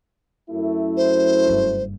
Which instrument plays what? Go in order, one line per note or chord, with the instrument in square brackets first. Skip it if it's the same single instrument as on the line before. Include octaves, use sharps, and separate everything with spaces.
[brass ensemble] F#2 A3 E4
[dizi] C5
[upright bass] F#1 G2